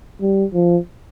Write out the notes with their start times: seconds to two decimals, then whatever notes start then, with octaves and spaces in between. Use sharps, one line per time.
0.21 G3
0.54 F3